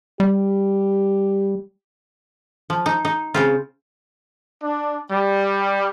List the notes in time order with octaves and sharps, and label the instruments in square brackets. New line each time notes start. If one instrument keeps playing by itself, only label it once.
[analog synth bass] G3 [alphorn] G4
[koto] F3
D#4
D#4
C#3 C4 F4
[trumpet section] D4
G3